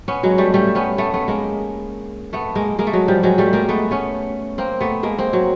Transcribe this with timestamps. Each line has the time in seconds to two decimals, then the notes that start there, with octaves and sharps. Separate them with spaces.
0.08 B3 C#4
0.23 F#3 G#3
0.38 G3 A3
0.54 G3 A3
0.75 B3 C#4
0.98 A3 B3
1.14 A3 B3
1.28 G#3 A#3
2.33 A3 B3
2.55 G#3 A#3
2.79 G#3 A#3
2.87 A3
2.93 F#3 G#3
3.08 F3 G3
3.23 F#3 G#3
3.38 G3 A3
3.53 G#3 A#3
3.69 A3 B3
3.91 B3 C#4
4.58 A#3 C4
4.81 A3 B3
5.03 G#3 A#3
5.18 A#3 C4
5.33 F#3